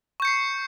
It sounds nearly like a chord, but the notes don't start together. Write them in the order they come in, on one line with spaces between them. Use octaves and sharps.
C#6 G6 C#7 C7